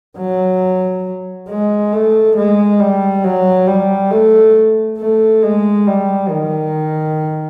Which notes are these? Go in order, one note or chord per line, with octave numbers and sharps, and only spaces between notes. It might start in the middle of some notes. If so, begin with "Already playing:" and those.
F#3
G#3
A3
G#3
G3
F#3
G3
A3
A3
G#3
G3
D#3